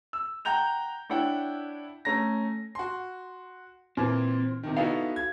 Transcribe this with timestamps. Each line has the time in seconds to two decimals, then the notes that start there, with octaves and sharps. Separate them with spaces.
0.13 E6
0.45 F#5 G5 A#5 G6 F7
1.10 D4 E4 C#5 F#5 G5
2.05 A3 C#4 A#5 A#6
2.75 F#4 C6
3.97 A#2 E3 C4
4.63 C3 D#3
4.77 B3 D#4 E4 F#4 A4 F5
5.16 G#6